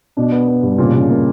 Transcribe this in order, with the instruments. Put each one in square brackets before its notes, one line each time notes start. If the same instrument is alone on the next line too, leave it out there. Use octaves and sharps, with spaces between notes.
[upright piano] B2 [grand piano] D4
[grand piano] B3
B3
G2
[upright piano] A#2 [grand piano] C#3
[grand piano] C#3
A#3